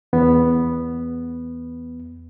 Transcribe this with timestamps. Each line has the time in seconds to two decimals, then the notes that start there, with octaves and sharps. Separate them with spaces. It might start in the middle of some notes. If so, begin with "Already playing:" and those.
0.13 E2 B3